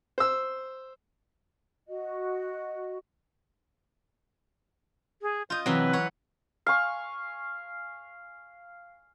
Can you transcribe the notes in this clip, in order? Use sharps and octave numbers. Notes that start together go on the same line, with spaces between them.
C5 E6
F#4 D#5
G#4
F4 D#5 G6
C3 E3 F#3 B4
C#5 F#5
F5 G#5 C#6